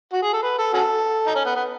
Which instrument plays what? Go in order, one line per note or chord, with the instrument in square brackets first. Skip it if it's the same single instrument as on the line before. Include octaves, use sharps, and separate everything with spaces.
[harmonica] F#4
G#4
A4
B4
A4
C#4 F#4 A4
D#4
C#4
B3
B3